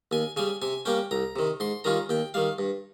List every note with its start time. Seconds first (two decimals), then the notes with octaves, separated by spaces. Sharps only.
0.11 D#2 G#5
0.37 C#3 G3 G#5
0.62 C3 G#5
0.85 G3 A#3 C#4 G5
1.11 C2 A#5
1.36 C3 D#3
1.60 G#2 C6
1.84 D#3 G3 C#4 F4 A#5
2.09 D#2 G5
2.34 D#3 G3 F5
2.59 G2